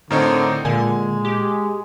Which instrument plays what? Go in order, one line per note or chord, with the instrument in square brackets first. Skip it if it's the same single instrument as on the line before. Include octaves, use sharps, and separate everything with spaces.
[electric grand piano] A2 C4 D#4 [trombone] D3 [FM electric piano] A#4 C#5
[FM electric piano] A#2 [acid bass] D3 [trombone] G#3 [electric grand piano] G#5
[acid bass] G4